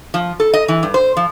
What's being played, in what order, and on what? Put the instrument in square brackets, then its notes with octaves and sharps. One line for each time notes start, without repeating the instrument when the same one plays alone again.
[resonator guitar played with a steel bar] F3
A4
D#5
E3
G2
C5
F3